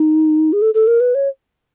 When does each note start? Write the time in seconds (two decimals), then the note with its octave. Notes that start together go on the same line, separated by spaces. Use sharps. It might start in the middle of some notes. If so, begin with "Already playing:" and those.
Already playing: D#4
0.53 G#4
0.62 A4
0.74 A4
0.87 A#4
1.00 B4
1.15 C#5